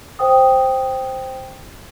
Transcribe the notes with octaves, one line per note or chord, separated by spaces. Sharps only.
C5 G5 D#6